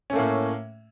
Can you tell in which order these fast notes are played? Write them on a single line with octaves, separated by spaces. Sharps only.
C#4 A3 A#3 A2